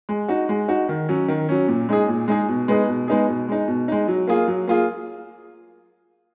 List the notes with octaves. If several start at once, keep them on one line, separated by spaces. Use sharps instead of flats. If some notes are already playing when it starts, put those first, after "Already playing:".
G#3
D#4 F#4
G#3
D#4 F#4
D#3
F#3 C#4
D#3
F#3 C#4
A#2
G#3 D#4 G#4
A#2
G#3 D#4 G#4
B2
G#3 B3 D#4 G#4
B2
G#3 B3 D#4 G#4
B2
G#3 D#4
B2
G#3 D#4
F#3
A#3 F4 G#4
F#3
A#3 F4 G#4